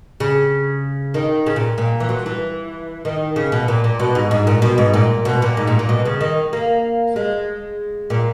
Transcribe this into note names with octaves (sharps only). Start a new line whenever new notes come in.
C#3
D#3
C#3
A#2
A#2
E3
F#3
E3
D#3
C#3
B2
A#2
A#2
B2
G#2
G#2
A#2
B2
G#2
A#2
B2
A#2
G#2
A#2
A#2
B2
C#3
D#3
A#3
G#3
A#2